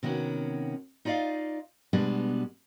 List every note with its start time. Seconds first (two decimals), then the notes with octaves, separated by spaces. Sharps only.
0.03 C3 D#3 B3 C#4 F#4
1.05 D#4 F4 D5 D#5 F5
1.93 B2 G3 G#3 B3 D4